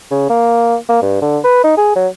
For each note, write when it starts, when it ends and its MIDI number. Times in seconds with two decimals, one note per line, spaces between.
0.11 0.27 49
0.30 0.76 58
0.89 1.00 58
1.02 1.17 43
1.22 1.38 50
1.44 1.63 71
1.64 1.76 63
1.77 1.93 68
1.96 2.08 54